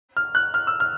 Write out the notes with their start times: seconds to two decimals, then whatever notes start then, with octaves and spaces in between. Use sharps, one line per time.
0.17 F6
0.35 F#6
0.54 F6
0.67 E6
0.80 F6